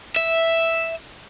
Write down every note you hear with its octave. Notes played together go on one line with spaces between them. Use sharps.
E5